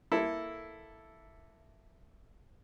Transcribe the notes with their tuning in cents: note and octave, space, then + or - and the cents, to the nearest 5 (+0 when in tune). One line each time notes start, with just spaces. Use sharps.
A#3 +0 E4 +0 A4 +0